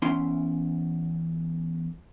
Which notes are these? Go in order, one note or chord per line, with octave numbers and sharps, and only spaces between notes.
E2 C#4 E4 C6